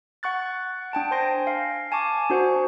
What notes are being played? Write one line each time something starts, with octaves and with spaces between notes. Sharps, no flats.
F#5 C#6 F#6 A6
D4 G5 A5 D7
C5 G#5 C6 A#6
F5
G#5 A5 C#6 D6
D4 F#4 C5 F#5